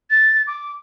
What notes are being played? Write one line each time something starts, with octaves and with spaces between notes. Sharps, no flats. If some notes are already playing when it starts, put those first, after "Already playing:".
A6
D6